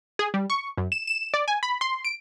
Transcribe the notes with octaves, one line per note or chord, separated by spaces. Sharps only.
G#4
G3
C#6
F#2
E7
E7
D5
G#5
B5
C6
D7